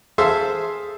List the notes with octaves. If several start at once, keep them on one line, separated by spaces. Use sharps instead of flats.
G#4 A4 C5 E5 F5